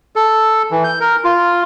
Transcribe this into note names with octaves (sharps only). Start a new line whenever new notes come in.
A4
E3
G6
A#4
F4